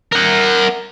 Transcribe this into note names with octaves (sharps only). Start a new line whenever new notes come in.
A#4 F#5